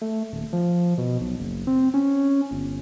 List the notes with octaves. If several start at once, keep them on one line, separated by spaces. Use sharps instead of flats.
A3
D#1
F3
B2
B1
F#1
C4
C#4
G1